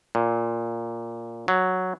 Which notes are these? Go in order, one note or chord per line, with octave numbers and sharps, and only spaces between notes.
A#2
F#3